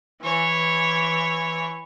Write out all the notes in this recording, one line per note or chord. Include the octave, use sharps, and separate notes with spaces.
E3 C#5